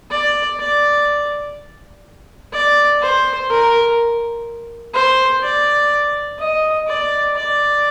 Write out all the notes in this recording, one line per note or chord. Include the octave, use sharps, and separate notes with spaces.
D5
D5
D5
C5
A#4
C5
D5
D#5
D5
D5